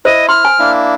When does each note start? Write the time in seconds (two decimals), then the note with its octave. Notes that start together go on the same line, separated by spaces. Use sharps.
0.05 E4 C5 D#5
0.29 C6 F6
0.45 G#5
0.59 A#3 D4 E4